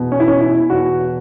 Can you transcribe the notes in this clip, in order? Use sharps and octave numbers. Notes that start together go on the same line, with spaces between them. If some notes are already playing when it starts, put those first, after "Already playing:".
Already playing: E2 B2
C#4
E4
C#4
E4
E2 B2 F#4